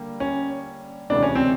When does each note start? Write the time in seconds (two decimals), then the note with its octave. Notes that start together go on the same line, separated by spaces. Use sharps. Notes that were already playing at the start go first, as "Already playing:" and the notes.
Already playing: D3 G3 A#3
0.20 C#4
1.10 E1 D2 C3 E3 G#3 D4
1.23 C#4
1.35 C4